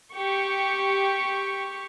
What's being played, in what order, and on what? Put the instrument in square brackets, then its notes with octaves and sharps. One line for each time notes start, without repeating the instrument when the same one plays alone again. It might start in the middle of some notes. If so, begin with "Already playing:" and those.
[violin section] G4 C#6